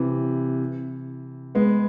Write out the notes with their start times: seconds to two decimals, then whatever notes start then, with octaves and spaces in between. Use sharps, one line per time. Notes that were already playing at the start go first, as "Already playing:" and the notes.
Already playing: C3 E3
1.55 G#3 B3